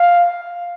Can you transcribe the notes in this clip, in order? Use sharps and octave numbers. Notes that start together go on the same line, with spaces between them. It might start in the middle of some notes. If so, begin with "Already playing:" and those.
Already playing: F5